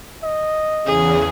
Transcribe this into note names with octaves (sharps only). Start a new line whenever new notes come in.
D#5
E2 C#3 G#4